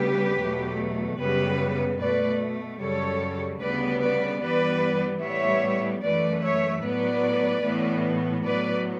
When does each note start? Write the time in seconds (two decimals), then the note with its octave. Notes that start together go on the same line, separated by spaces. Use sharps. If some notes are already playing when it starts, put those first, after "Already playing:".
Already playing: D2 C#3 G3 B3 G4 B4
0.38 E2 B2 F#3 A3
1.19 F#2 C#3 G3 B3 G4 B4
1.99 B2 A3 B4 D5
2.80 F#2 C#3 G3 A4 C#5
3.60 D2 C#3 G3 B3 B4 D5
4.01 B4 D5
4.41 G2 E3 G3 B3 B4 D5
5.22 A2 G3 B3 C#5 E5
6.03 F#2 E3 A3 B4 D5
6.42 C#5 E5
6.83 A2 F#3 B3 B4 D5
7.64 A2 E3 B3
8.44 A2 F#3 B3 B4 D5